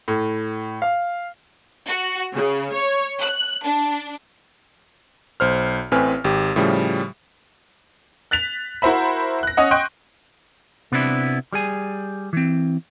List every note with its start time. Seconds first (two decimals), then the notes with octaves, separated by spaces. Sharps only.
0.08 A2
0.82 F5
1.87 F#4
2.34 C#3
2.72 C#5
3.20 F#6
3.64 D4
5.40 B1 C5 F6
5.91 A1 A2 C4 B4 G#5 F6
6.24 G#1 G4
6.56 A2 C#3 F3 G3
8.31 F#6 A6 B6 F7
8.82 E4 F#4 A#4 C5 E5 B5
9.43 F#6 A#6
9.57 C#4 D#5 F#5
9.71 D#5 G5 C6 C#6 F#6
10.92 C3 B3 C4 D4 E4
11.53 G3 G#4 G#5
12.33 E3 C4